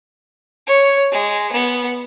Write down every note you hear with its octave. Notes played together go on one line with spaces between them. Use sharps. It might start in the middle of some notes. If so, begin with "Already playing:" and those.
C#5
G#3
B3